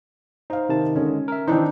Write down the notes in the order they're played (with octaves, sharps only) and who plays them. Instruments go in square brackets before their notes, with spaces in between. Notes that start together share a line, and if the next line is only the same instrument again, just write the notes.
[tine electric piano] D#4 [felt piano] C5 F5
[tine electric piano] C3 A5 [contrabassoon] D#3
[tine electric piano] D3 G#3 [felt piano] C#4
[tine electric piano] A#4 E5
[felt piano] D#3 D4 D#4 [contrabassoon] E3 [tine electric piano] C4 C5